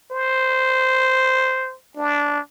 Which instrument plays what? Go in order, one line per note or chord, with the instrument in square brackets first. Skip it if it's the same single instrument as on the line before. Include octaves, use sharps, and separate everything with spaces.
[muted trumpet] C5
D4